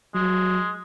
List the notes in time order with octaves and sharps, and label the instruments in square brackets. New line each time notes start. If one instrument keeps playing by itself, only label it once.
[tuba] F#3 [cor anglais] G#3